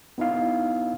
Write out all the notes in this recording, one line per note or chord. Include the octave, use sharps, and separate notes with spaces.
B3 D#4 E4 F5